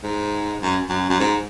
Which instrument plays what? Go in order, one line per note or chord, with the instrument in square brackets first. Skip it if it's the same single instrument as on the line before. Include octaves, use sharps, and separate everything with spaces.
[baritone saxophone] G#2
F#2
F#2
F#2
G#2